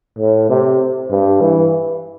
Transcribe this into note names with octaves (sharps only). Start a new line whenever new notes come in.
A2
C3
G2
E3